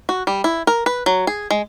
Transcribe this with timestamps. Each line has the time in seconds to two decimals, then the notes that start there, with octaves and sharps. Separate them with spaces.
0.09 F#4
0.27 G3
0.44 E4
0.67 A#4
0.86 B4
1.06 F#3
1.27 G#4
1.51 G#3